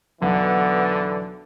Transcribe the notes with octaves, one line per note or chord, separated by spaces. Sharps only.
B1 D3 E3 B3